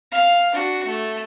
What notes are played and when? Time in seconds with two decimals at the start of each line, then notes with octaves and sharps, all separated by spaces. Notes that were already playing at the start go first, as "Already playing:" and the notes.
0.12 F5
0.52 D4 F#4
0.85 A3